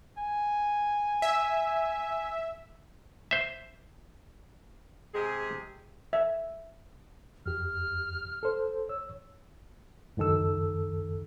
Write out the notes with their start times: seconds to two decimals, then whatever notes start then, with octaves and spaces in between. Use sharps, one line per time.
0.18 G#5
1.22 E5
3.31 C5 E5
5.14 C3 G#3 G#4
6.13 E5
7.46 F2 G4 F6
8.43 A4 C5
8.89 C#5 E6
10.17 C#2 F#2 D#3 A4 E6